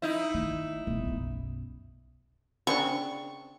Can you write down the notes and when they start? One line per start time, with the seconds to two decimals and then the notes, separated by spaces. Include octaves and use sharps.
0.02 D#4 E4
0.34 D#3
0.87 E1 B3
1.05 B1 F#2
2.67 C#3 C4 D4 C#6